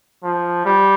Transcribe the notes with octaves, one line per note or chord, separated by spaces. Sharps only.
F3
G3